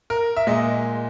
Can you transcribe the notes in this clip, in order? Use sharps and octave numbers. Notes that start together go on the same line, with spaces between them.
A#4
E5
A#2 G#3 D#5